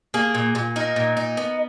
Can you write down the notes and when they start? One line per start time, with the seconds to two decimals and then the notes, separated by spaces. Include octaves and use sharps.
0.14 A#3 G#4
0.35 A#2
0.55 A#2
0.76 D#4 A#4
0.96 A#2
1.17 D#4
1.37 B3